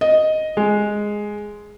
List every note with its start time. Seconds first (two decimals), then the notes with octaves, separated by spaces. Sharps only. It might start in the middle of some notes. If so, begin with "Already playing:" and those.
0.01 D#5
0.57 G#3